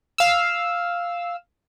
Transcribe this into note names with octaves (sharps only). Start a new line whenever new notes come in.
F5 E6